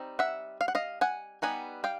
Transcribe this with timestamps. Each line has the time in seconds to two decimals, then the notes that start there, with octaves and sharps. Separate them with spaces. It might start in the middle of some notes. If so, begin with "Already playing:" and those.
Already playing: G3 C4 D#4
0.19 E5 F#5
0.61 F5
0.68 F#5
0.75 D#5 F5
1.01 F#5 G#5
1.42 G3 B3 D#4 F#5 G#5
1.84 F5 G5